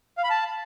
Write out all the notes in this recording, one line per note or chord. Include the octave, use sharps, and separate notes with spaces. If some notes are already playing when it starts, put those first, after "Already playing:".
F5
B5
A5